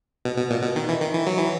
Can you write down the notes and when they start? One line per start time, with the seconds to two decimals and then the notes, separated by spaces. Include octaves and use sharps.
0.25 B2
0.38 B2
0.51 A#2
0.63 B2
0.76 D#3
0.89 E3
1.01 D#3
1.14 E3
1.27 F#3
1.38 E3